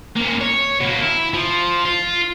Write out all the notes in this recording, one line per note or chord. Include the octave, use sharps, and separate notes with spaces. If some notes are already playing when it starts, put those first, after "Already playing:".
A#3 C#4
C#5
B2 A#3
E4
F3
F4